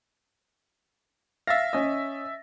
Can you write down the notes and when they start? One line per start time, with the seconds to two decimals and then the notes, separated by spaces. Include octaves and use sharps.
1.47 E5 F5 A6 A#6
1.73 C#4 D#5